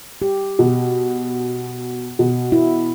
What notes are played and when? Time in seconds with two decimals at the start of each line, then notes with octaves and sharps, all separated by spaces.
0.22 G4
0.59 B2
2.19 B2
2.52 E4